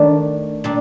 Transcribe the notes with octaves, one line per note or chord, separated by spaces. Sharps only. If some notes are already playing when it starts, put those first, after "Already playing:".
Already playing: D#3 A3 D4
A#2 G3 D4